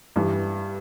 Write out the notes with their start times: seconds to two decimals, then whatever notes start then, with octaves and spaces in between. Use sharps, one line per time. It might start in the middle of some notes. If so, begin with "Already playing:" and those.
0.16 G2 E3 G3